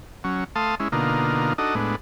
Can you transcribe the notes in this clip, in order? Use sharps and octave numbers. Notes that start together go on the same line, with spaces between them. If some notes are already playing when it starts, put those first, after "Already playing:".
F#3 C#4
A3 F5 A5 C6 D#6
G#3 C#4 E4
B2 D3 A#3 D#4 F4
D4 D#4 F#4 A4 D#5
A2 G#3 B3 D4